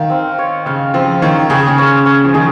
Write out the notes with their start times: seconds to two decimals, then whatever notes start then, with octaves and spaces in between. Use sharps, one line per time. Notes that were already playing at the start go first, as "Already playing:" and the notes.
Already playing: D#3 F5
0.10 C4
0.39 C#5
0.66 C#3 F5
0.94 F3 C4
1.22 D#3 C#5
1.50 C#3 G#4
1.68 C#3
1.78 C#4
2.06 C#4
2.24 F3
2.34 D#3 G#4